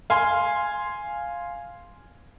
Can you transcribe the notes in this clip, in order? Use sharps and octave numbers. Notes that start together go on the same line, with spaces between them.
F5 G#5 C6